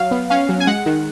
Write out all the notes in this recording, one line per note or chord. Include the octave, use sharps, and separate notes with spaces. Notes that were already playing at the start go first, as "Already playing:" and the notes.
Already playing: F#3 F5
B3
C#4 F5
F#3
G#5
G#3 F#5
D#3